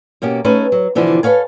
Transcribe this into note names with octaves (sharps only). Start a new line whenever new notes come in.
B2 A#3 C#4 G4
A3 C#4 D#4 G#4 B4
F#3
B2 D3 E3 F3
A4 B4 C#5 F5 G#5